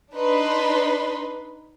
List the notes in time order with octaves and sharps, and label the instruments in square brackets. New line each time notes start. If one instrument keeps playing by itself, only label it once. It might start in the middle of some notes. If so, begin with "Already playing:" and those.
[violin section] D4 D#4 B4 B5 C6